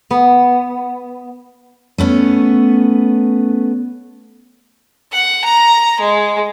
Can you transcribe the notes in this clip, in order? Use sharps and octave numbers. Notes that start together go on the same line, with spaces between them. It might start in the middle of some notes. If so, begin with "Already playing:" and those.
B3
A3 B3 C#4
F#5
A#5
G#3